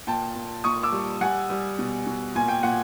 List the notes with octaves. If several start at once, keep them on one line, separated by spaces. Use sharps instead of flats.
A#2 G5 A5
A#2
A#2 C#6 D#6
D6 E6
G3
G3 F#5 G#5
G3
B2
B2
A#2 G#5
G5
A#2 F#5